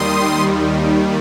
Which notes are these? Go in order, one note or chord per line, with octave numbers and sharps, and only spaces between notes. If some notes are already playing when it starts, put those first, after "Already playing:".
Already playing: D#2 D#3 G3 C6 D#6